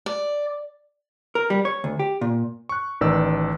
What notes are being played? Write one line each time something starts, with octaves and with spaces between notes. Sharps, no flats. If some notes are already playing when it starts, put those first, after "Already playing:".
D5
A#4
G3
C#5
D2
G4
A#2
C#6 F#6
A1 D#3 B4 D5 E6